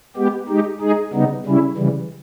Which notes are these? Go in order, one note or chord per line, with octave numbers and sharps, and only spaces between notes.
G#3 B3 G4
G#3 D#4 G4
G#3 D#4 G#4
C#3 G3 B3 D#4
C#3 G3 C#4 E4
C#3 E3 G3